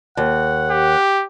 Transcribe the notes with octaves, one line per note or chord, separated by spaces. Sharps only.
D#2 F#5
G4